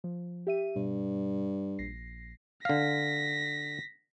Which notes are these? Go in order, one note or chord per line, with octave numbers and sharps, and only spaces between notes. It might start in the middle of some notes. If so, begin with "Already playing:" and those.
F3
G4 E5 D#7
G2 B2
A#1 A#6 C7
D3 F5 A#6 B6